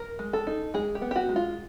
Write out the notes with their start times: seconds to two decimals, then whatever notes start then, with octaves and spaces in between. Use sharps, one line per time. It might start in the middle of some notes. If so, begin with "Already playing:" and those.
Already playing: A#4
0.19 G#3
0.33 A4
0.47 D#4
0.74 G#3 G#4
0.95 G4
1.01 B3
1.11 G4
1.16 F#4
1.29 G#3
1.36 F4